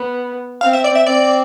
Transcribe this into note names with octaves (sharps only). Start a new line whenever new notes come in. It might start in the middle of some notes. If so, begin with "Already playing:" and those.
Already playing: B3
C4 F5
E5
D5
E5
C4 D5